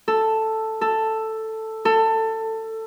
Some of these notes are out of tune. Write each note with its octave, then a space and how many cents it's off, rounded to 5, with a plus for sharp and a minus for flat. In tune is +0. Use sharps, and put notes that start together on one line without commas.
A4 +5
A4 +5
A4 +20